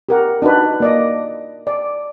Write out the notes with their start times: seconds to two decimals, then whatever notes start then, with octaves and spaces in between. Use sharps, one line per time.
0.09 G4 A#4 F#5
0.42 D4 D#4 F#4 B4
0.80 A#3 D5 D#5
1.67 D5